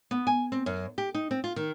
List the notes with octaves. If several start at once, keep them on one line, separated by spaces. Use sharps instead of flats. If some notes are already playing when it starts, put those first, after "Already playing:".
B3
G#5
C4
F#2
G4
D#4
C4
F4
D#3